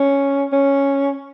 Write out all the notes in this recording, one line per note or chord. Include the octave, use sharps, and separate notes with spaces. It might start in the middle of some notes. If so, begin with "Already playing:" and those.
Already playing: C#4
C#4